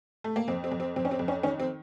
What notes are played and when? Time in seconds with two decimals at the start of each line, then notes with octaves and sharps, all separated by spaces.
0.24 A3
0.36 A#3
0.48 F2 C4
0.64 C4
0.72 F2
0.80 C4
0.96 F2 C4
1.05 C#4
1.11 C4
1.19 F2
1.28 C#4
1.43 D#3 C#4
1.60 C4